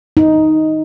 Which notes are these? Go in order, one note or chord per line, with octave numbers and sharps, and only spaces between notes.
D#4